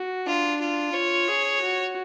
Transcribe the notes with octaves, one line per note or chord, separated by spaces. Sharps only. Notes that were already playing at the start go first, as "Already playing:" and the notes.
Already playing: F#4
D4 F4
F4
F4 C#5
G#4
F#4